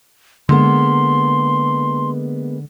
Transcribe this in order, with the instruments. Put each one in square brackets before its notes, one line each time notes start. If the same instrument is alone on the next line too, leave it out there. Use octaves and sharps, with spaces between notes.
[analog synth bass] D3 [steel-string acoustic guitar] G#3 A#3 B3 [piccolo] C6